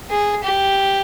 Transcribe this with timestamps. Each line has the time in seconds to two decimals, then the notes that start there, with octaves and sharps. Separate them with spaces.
0.11 G#4
0.44 G4